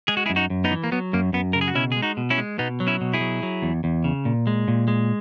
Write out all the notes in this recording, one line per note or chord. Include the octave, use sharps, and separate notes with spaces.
G#3 G#4
F#4
E4 G#4
F#2
D#4 F#4
F#2
B3 D#4
E3
A#3
F#3 B3
F#2 A#3
F#2 B3
C#3 A#4
G#4
F#4
B2 C#4 E4
G#3 G#4
D#4 F#4
B2
C#4 E4
G#3
B2 B3 D#4
F#3
C#4 E4
B2
E4 G#4
F#3
F#3
E2
E2
C#3
A#2
G#3
A#2
G#3